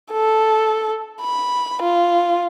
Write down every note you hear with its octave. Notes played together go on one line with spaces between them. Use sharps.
A4
B5
F4